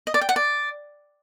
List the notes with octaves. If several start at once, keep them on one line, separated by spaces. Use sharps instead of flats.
D#5
D5
G5
F#5
D5